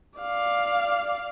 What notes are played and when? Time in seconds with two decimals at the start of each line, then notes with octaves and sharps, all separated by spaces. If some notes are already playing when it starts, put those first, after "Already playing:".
0.19 D5 F5